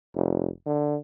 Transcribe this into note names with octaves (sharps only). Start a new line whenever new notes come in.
F1
D3